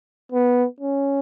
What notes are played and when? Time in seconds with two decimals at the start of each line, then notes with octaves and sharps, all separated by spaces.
0.32 B3
0.80 C#4